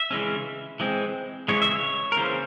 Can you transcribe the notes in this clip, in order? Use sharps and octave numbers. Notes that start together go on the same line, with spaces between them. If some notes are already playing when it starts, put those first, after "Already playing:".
Already playing: E5
C#3 E3 G#3 C#4
E3 G#3 C4
C#3 E3 G#3 C#5
E5
C#5
A#4
C#3 E3 A#3 C#4 C5